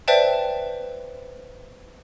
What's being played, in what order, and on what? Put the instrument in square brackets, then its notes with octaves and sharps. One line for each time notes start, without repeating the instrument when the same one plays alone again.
[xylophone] B4 C5 D5 E5 G5 A5